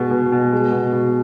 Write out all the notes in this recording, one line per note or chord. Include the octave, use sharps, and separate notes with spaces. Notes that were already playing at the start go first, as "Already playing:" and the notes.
Already playing: B2 G#3
B2
B2
G#3
B2
B2